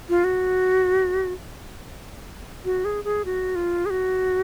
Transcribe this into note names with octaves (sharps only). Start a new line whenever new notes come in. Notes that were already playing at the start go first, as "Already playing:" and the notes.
F4
F#4
F#4
G#4
G#4
F#4
F4
G#4
F#4